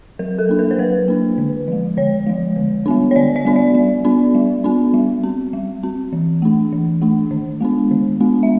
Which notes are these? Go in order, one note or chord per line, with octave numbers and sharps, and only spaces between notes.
F#3 A#4
A4
A#3 D4
A#4
C5
F#3 B4
A#3 D4
D3
F3 G#3
D3 C#5
F3 G#3
D3
G3 B3 D4
C#5
D3 D5
D5
G3 B3 D4
D5
G3
B3 D4
G3
B3 D4
G3
C4
G3
C4
E3
A3 D4
E3
A3 D4
D#3
G#3 B3 D4
D#3
G#3 B3 D4
E5